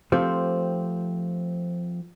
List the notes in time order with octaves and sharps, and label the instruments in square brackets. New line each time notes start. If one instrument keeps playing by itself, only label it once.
[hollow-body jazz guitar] F3 A3 C4 G4